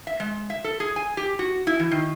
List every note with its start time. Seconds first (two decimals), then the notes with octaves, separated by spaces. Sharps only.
0.07 E5
0.20 G#3
0.50 E5
0.64 A4
0.80 G#4
0.96 G#5
1.17 G4
1.39 F#4
1.67 E4
1.80 E3
1.91 D#3